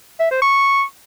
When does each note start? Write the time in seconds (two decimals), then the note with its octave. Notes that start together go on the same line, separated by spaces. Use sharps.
0.20 E5
0.31 C5
0.42 C#6